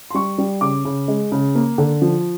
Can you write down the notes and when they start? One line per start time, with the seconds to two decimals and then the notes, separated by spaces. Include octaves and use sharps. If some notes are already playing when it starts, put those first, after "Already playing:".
0.10 C6
0.14 G3 C#6
0.38 G3
0.61 C#3 D6
0.85 C#3
1.08 G#3
1.32 C#3
1.55 A#3
1.78 D3
2.02 F3